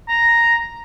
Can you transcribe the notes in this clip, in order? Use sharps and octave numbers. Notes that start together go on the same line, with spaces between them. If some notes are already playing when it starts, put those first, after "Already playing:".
A#5